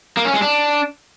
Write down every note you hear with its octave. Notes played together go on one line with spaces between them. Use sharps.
A#3
C#4
G#3
D4